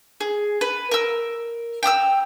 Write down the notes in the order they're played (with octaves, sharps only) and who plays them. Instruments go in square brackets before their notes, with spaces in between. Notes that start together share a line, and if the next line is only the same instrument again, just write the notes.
[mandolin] G#4
B4
A#4 E6
G5 A#5 D#6 E6